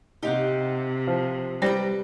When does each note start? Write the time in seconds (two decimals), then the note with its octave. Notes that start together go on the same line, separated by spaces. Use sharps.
0.23 C3 D#4 G4 F5 F#5
1.07 F3
1.62 G3 G4 B4 C5 D5 A#5